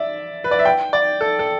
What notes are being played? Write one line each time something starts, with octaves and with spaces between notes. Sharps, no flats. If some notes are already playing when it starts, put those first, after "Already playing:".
Already playing: D5 E5
B4
D5
E5
G5
D5
A4
A4